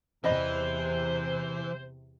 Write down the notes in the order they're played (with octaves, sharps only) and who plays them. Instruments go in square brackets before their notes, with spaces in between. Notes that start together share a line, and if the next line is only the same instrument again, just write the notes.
[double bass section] E2 C3 [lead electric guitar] E3 [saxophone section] C5 [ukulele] D5 D#5 B5